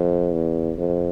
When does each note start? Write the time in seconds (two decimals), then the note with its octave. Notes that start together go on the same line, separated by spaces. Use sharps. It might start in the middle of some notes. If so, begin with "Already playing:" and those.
Already playing: F2
0.33 E2
0.78 F2